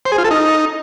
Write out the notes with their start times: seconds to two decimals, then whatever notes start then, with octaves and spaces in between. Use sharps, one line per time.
0.05 C5
0.12 G#4
0.18 F4
0.24 A4
0.31 D#4